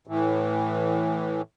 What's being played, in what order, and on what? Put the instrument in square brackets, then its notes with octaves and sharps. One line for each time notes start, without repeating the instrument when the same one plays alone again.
[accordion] A2 E3